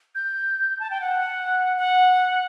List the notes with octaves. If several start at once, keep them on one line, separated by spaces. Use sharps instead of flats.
G6
A5
G5
F#5
F#5